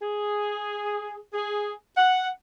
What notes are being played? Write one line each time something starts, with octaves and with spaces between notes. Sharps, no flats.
G#4
G#4
F#5